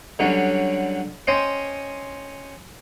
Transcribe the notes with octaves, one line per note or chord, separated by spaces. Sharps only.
D3 F#3 G3 C#4 D4
C#4 C5 D#5 G5 G#5 C6